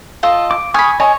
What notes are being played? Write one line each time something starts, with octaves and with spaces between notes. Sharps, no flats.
F4 A4 D#5
D6
G#5 B5 C#6 D#6 F6
C#5 D#5 G#5